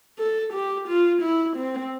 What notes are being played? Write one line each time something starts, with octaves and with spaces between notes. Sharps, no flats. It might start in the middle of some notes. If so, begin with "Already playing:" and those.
A4
G4
F4
E4
C4